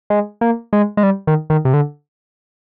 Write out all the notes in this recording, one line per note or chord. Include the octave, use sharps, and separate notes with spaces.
G#3
A#3
G#3
G#3
G3
D#3
D#3
C3
D3